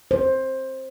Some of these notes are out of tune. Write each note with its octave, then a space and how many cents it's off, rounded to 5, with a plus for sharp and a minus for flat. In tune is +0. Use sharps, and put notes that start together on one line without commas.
C5 +15